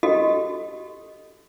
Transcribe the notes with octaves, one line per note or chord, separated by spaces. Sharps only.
F#4 G4 A4 D#5